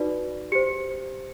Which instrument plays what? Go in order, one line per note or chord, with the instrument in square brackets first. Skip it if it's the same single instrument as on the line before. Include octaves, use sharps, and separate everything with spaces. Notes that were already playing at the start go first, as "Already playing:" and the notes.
Already playing: [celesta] D#4 F#4 B4 D5
G4 C5 C#7